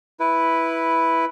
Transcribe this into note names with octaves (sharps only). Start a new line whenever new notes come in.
E4 B4